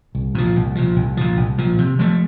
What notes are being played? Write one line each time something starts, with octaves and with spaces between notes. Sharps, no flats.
C2
A#2 F3
C2
A#2 F3
C2
A#2 F3
C2
A#2 F3
C3
F3 A3